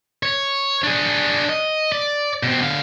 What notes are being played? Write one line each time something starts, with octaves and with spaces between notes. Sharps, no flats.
C#5
D4 G#4
D#5
D5
B2 C4
D3 F5